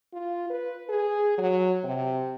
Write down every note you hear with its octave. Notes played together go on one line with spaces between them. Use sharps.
F4
B4
G#4
F#3
C3